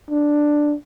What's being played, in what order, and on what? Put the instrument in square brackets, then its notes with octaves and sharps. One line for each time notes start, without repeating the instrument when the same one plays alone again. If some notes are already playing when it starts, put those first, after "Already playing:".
[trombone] D4